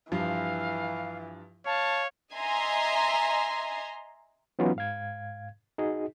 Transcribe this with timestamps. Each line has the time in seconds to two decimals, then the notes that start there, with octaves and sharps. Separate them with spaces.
0.12 G2 E3 F3 F4 F5
1.66 C#5 F5 A5
2.35 D#5 E5 G#5 A#5 C6
4.59 E3 F#3 B3 C#4 D#4 F4
4.76 G#2 F5 G#6
5.78 D#4 F#4 G#4 D#5